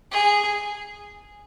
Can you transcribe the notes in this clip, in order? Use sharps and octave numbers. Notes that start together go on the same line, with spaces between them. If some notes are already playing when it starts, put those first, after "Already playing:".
G#4